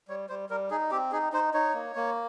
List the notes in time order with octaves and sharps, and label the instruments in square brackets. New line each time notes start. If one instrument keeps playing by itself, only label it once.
[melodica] G3 C#5
G3 C5
G3 A#4
D#4 G#4
C4 G4
D#4 G#4
D#4 C5
D#4 C#5
A#3
A#3